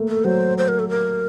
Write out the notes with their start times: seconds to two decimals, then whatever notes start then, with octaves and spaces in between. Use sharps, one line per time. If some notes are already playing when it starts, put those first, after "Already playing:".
Already playing: A3 A#3
0.08 A4
0.24 F#3 C5
0.58 C5
0.68 A#4
0.79 A4
0.89 A#4